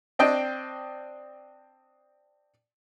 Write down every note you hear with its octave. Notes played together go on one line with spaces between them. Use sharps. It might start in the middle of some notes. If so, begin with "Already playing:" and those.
C4 D4 D#5 G5